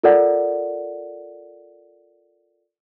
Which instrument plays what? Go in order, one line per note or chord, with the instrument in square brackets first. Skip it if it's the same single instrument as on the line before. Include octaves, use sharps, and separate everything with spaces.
[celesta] F4 A4 A#4 D5 F#5